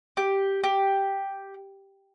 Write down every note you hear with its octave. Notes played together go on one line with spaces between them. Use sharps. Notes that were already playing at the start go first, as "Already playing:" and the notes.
G4
G4